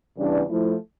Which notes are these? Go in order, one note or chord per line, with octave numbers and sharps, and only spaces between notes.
E2 C#3 E3 G3 D4
F3 A3 E4